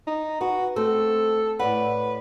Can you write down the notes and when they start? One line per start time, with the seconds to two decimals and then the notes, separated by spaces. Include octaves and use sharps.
0.07 D#4
0.41 F#4 B4
0.76 A3 C4 A4 C5
1.59 A2 B4 D5 F#5